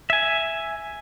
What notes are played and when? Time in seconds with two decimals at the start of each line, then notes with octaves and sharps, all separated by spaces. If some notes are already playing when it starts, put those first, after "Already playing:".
0.10 E5 G#5